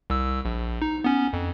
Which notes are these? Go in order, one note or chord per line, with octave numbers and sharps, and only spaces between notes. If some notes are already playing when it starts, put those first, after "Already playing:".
C2 E6
A#1
D#4
B3 C#4
F2